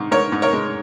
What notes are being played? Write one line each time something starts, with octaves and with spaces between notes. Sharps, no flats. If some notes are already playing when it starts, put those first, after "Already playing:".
Already playing: G#2 D#3
G#2 A#4 C#5
G#2
A#4 C#5
G#3